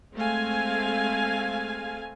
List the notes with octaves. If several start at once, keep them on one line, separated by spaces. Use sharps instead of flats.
G#3 A3 C4 F5 G#5